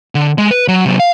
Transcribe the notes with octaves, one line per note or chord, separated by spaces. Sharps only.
D3
G#3
B4
F#3
C3 F#3
F5